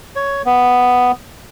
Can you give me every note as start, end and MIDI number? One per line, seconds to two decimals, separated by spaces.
0.16 0.42 73
0.46 1.12 59